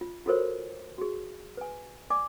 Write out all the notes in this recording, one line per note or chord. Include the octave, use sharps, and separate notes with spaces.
F4
F4 F#4 A4 A#4 C5 C#5
F#4 G#4
B4 G#5
D5 G#5 D6